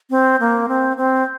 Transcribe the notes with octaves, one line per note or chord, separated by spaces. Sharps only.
C4
A#3
C4
C4